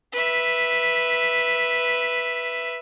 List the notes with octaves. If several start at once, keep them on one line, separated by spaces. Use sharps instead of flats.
B4 E5